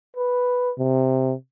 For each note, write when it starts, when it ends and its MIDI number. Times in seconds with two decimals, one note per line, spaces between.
0.17 0.71 71
0.78 1.34 48